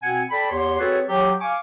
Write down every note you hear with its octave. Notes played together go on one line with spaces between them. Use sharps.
B2 C4 F#5 G#5
A4 D5 G5 B5
E2 G4 C#5 C6
C4 F#4 G#4 A4 B4 C#5
F#3 G4
F5 G#5 C#6 D6